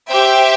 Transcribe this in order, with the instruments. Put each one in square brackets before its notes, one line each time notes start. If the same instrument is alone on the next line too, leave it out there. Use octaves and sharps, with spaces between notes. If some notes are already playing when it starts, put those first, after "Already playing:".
[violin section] G4 C5 E5 G5